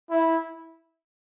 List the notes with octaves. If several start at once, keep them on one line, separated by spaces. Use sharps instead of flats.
E4